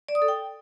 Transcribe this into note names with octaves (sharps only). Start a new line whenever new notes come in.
D5
D#6
A4
G5